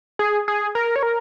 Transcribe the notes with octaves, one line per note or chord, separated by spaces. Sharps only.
G#4
G#4
A#4
C#5
A#4